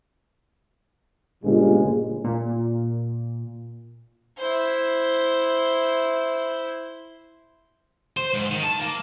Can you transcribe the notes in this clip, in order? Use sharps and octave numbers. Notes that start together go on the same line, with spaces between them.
G1 A#2 C#3 G#3
A#2
E4 C5
C5
G#2
D#3
A5
A#3